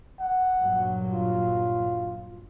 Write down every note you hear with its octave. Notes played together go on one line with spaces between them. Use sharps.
F#5
G2 A#2 F#3
F4